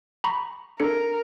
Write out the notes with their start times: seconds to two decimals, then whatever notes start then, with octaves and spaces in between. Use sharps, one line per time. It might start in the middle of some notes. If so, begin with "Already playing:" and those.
0.24 A#5 B5 C#6
0.80 D4 A4 A#4 C#7